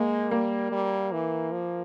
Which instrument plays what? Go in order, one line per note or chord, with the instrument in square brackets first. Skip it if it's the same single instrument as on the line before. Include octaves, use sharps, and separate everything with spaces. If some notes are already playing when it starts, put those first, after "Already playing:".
Already playing: [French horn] G#3 [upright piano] A#3
[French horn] G3 [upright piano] A#3
[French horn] G3
E3
F3